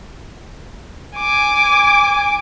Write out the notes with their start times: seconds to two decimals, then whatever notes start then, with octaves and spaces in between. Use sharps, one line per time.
1.17 G#5 D6